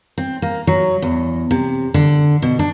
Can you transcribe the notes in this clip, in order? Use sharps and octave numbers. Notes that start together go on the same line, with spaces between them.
C4
A#3
F#3
E2
C3
D3
B2
D4